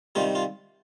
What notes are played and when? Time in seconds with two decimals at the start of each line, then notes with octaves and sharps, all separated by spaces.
0.15 C3 D#3 G3 F4
0.35 F4